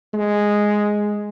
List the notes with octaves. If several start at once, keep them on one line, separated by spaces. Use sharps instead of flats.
G#3